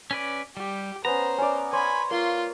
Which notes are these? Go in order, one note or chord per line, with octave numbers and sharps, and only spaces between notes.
C#4 B4 D5
G3 G4
B3 C#4 C5 A#5
C#4 D5
C5 C#5 G#5 B5
A#3 F4 C6